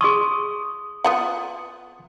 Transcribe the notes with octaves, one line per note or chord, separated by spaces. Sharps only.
G#4 C6 C#6 D#6
B3 F4 F#5